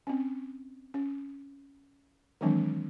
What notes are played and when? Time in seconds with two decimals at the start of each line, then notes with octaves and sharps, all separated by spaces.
0.07 C4 C#4
0.94 C#4
2.41 D#3 E3 F#3 G#3 C4 D4